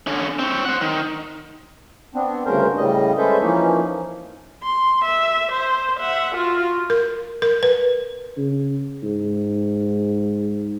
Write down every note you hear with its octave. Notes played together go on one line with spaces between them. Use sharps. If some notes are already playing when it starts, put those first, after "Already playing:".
D3 C#4
C4 C#5
C5 F#5
D#3
B3 C4 D4
D2 G2 C#3 C#4 A#4 C5
A2 C#3 G3 D#5
G#3 C#4 A4 B4 C5 E5
E3 F3 A#3 C#4 D#4
C6
E5
C5
E5 F#5
F4 F#4
A#4
A#4
B4
C#3
G#2